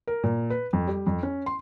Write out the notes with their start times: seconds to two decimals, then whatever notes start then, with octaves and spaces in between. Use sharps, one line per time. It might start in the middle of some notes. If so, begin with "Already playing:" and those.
0.07 A#4
0.24 A#2
0.50 B4
0.73 F2
0.88 G3
1.07 F2
1.23 C#4
1.46 C6